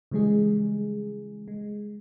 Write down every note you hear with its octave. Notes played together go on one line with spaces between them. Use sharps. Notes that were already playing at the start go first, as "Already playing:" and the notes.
C#3 E3 G3 G#3 G#4
G#3